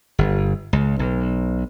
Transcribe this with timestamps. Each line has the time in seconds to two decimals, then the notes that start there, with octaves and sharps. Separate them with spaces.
0.19 G1
0.73 C#2
0.99 B1